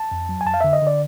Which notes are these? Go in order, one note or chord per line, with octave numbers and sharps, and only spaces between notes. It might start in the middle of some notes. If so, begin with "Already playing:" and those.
Already playing: A5
F2
F#3
G#5
F2 A5
F5
D3 E5
D#5
D3
D5